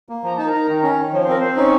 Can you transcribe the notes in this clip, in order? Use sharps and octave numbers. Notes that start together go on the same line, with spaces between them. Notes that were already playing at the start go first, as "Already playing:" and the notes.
A#3
F3 A#5
D#4 A5
A#4 A#5
D#4
D#3
C#4
D#3
F3 C#5
C5
C4 A#4
C4 C5
C#4 D#4 C#5